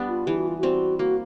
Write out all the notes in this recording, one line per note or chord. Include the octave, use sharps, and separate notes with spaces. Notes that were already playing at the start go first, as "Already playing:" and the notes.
Already playing: G3 B3 D4
F4
E3 G4
F#4
F4
G3 C4 F#4
A#3 F#4